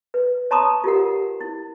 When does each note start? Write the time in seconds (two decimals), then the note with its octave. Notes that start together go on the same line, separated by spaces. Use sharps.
0.14 B4
0.51 C#5 A5 A#5 C6 C#6 D#6
0.84 F4 G4 A#4 F#5
1.41 E4